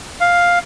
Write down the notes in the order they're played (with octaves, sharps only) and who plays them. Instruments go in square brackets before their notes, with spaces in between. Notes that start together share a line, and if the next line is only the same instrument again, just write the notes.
[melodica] F5